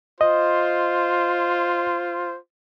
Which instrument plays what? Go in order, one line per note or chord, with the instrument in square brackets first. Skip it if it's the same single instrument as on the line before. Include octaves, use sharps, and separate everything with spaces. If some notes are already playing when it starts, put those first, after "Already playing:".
[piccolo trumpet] F4 [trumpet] C5 [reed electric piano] D#5